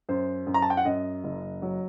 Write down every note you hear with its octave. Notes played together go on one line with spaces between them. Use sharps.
F#2 C5
F#2
A#5
A5
G5
F#5
F#2 D#5
F#1
F#3